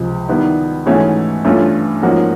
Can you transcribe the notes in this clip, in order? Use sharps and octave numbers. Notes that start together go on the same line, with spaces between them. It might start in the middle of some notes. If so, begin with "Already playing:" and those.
Already playing: C#2 C3 F3 G#3
D#3 G3 B3 E4
G#2 E3 A3 C#4 F#4
G2 E3 A3 C#4 F4
G#2 F3 A#3 C#4 F#4